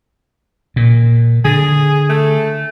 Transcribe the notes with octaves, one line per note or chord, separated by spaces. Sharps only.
A#2
D3 G#4
A3